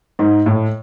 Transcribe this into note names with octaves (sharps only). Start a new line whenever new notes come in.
G#2
A2